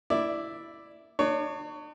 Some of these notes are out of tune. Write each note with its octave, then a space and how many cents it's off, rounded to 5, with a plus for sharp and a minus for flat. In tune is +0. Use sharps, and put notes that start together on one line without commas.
E4 +0 D5 +0
D4 +45 C#5 +15